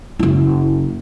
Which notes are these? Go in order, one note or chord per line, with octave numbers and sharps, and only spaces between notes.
F#1 E4